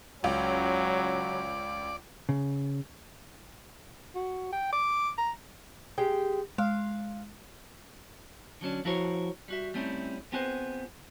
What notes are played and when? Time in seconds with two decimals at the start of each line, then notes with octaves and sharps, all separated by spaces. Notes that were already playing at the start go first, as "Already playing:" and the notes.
0.24 C#2 F#3 C#4 D5
2.29 C#3
4.15 F#4
4.53 G5
4.73 D6
5.18 A#5
5.98 G#3 G4 G5
6.58 G#3 F5
8.61 D3 F#3 C#4 D4
8.85 F3 E4 F#4 A#4 C5 C#5
9.48 G3 F#4 E5
9.74 G3 A3 C4 C#4 D#4 E4
10.32 B3 C4 F4 G#4 B4 C5